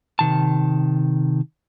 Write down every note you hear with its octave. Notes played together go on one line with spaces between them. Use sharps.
C3 D#3 A5